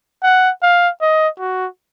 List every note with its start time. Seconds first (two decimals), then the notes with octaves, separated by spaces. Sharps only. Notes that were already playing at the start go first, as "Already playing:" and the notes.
0.23 F#5
0.62 F5
1.01 D#5
1.39 F#4